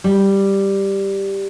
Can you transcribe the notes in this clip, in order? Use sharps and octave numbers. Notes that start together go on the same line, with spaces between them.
G3